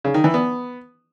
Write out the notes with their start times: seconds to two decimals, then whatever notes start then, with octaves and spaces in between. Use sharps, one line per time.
0.04 C#3
0.14 D#3
0.24 E3
0.34 B3